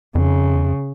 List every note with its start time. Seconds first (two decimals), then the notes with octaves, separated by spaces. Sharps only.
0.15 F2 C#3
0.55 E2
0.64 F2